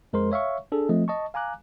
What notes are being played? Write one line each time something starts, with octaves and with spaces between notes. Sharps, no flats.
F2 G#3 A#4 C5 C6
C#5 E5 F5 C#6
D4 G#4 A4
F3 A3 C4 D#5
D#5 A5 C#6
F5 G#5 A#5 D6 F#6